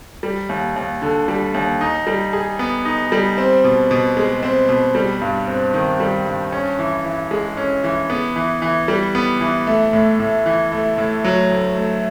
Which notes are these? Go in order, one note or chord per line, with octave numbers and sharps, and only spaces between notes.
G3
D#2
D#2
D3
G3
D#2
D#4
G3
G#4
B3
D#4
G3
C4
B2
B2
G#3
C4
B2
G3
G2
C4
D#3
G3
G2
C#4
E3
E3
G#3
C#4
E3
B3
E3
E3
G3
B3
E3
A3
A2
A2
E3
A3
A2
F#3
D2
A3